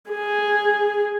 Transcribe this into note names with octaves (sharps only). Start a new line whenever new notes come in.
G#4